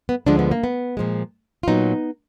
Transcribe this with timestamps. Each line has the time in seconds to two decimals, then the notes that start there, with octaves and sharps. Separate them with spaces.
0.09 B3
0.26 D2 D3 F3 G#3 D4
0.39 B3
0.51 A#3
0.64 B3
0.97 A#2 F3 G#3
1.63 F4
1.67 A#2 F#3 B3 D#4